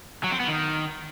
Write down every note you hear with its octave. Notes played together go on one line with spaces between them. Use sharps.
F#3
C4
B3
D#3